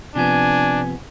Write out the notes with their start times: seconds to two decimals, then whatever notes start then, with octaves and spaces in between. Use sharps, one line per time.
0.16 C3 F3 B3 D4 G#5